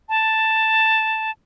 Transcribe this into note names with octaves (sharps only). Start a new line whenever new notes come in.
A5